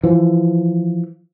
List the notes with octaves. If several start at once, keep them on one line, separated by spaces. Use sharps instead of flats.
E3 F3